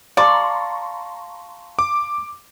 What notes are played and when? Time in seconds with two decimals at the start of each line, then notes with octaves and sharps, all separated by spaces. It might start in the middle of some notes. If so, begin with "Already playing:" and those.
0.17 D5 F5 A5 A#5 C6 C#6
1.79 D6